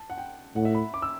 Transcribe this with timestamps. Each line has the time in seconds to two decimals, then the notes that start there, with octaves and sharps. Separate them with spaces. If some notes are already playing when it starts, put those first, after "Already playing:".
Already playing: A5
0.10 F#5
0.18 G5
0.55 A2 F#5
0.65 E5
0.75 B5
0.94 D6
1.02 E6